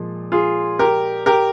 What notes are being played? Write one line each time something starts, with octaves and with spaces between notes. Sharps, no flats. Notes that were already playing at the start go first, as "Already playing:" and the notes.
Already playing: A#2 F3 G#3
F4 G#4
G4 A#4
G4 A#4